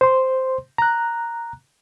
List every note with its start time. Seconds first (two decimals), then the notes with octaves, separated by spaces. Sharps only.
0.01 C5 C6
0.78 A#5 F#6